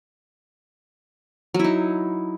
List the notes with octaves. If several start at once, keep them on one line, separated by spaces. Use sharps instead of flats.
F#3 D#4 E4